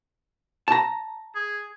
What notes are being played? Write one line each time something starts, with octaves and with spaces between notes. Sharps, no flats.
A5 A#5
G#4